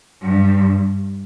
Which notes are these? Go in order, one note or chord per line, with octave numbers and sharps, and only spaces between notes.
G2